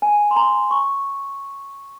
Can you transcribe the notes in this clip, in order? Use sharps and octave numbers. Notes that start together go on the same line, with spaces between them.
G#5
C6
A#5
C#6